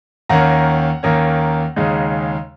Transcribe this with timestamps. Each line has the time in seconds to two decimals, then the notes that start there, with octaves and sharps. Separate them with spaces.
0.29 D#2 D#3 A#3 C#4 F#5 A#5
1.03 D#2 D#3 A#3 C#4
1.76 D#2 C#3 G#3 D#4